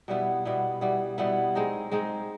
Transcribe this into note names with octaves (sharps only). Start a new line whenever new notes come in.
B2 G3 B3 E4
B2 G3 B3 E4
B2 G3 B3 E4
B2 G3 B3 E4
G#3 C4 D#4
G#3 C4 D#4